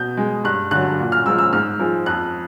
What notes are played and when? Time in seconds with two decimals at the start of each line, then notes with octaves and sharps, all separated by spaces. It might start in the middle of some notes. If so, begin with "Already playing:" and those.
Already playing: B2 G6
0.17 G#3
0.44 G2 F#6
0.71 D3 F#3 F#6
0.99 A#2
1.12 F6
1.26 F3 G#3 E6
1.38 E6
1.53 G#2 F6
1.80 F3 G#3
2.06 F2 F#6